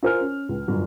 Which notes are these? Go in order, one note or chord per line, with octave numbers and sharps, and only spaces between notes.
F4 A#4 C5 G#5 F6
C#4
C#2
G1 F#2